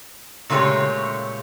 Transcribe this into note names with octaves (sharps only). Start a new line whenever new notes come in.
A#2 C#3 G#3 A3 G4 C#5